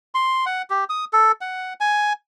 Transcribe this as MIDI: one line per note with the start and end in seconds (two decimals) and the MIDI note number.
0.15 0.45 84
0.46 0.62 78
0.70 0.84 67
0.89 1.05 87
1.13 1.32 69
1.41 1.73 78
1.80 2.13 80